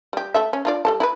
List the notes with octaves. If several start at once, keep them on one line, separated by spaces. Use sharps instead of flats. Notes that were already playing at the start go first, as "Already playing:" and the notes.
G3 G4
A3 A4 E5
C#4
D4 F4 D5
G3 A4 A5
E4 A#4 B4